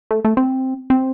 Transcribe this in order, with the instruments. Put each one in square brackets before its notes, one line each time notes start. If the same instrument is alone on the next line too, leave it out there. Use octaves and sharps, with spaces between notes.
[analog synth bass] A3
A3
C4
C4